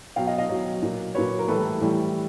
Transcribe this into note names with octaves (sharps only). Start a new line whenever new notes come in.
B2 F#3 F5 G5
D#5 F5
D#5 F5
B2 F#3
A#2 F#3
A#2 F#3 B4 C#5
A#4
A2 E3 G3 A4 B4
A2 E3 G3